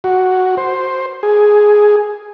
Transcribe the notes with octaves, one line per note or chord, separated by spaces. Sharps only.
F#4
C5
G#4